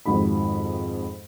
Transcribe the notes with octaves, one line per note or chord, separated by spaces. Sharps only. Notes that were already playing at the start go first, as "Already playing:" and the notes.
F2 G#2 D#3 F#4 B5